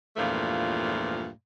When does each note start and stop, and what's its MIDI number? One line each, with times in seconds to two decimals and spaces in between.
0.17 1.29 40
0.17 1.29 43
0.17 1.29 46
0.17 1.29 53
0.17 1.29 57
0.17 1.29 77